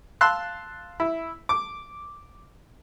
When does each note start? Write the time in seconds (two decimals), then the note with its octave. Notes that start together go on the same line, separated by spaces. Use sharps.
0.21 F5 A5 C6 E6 F#6
1.00 E4
1.49 D6